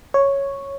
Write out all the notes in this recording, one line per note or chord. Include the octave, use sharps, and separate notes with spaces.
C#5